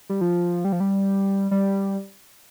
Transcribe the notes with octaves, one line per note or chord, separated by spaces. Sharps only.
G3
F3
G3
F3
G3
G3